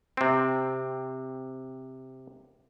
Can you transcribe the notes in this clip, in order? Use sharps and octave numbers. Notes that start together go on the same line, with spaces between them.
C3 C4